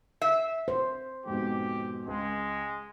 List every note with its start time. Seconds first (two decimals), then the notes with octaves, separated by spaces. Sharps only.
0.22 E5 C7
0.68 C5
1.26 F2 G#2 B2 G4
2.07 C#2 G#3